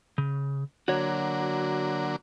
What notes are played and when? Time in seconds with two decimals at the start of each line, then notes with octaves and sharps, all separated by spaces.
0.18 C#3
0.88 D3 F#3 A#3 F#4 C#5